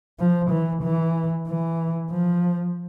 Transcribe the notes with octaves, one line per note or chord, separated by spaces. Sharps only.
F3
E3
E3
E3
F3